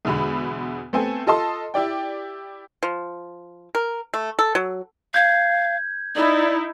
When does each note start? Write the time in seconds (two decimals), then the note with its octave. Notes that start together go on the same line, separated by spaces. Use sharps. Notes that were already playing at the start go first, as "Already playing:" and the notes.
0.05 E2 B2 D3 G#3 B5
0.93 A3 B3 C4 A4 G#5
1.27 F4 A4 D#5 A5 C6
1.74 E4 G4 D5 G5
2.83 F3
3.75 A#4
4.14 A3
4.39 A4
4.55 F#3
5.14 F5 G6 G#6
6.16 D#4 E4 D5